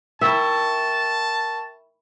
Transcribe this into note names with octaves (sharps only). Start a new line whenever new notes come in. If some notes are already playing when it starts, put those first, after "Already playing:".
E4 A#4 E5 G5 A5 C#6